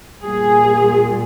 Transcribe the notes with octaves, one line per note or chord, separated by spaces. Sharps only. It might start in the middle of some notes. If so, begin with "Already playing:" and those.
A#2 G3 G#4